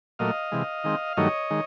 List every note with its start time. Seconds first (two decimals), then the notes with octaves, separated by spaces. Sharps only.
0.19 A#2 F#3 A3 D#5 F5
0.52 C3 E3 G#3
0.84 D#3 G#3 C4
1.17 G2 D#3 F#3 A3 C#5 D#5
1.50 D#3 G#3